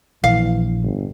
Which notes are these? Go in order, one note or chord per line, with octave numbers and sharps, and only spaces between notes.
A#1 E3 F5
G1